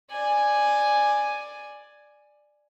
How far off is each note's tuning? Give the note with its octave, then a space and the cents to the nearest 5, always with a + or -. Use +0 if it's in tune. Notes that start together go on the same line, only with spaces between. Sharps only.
D5 +10 G#5 +0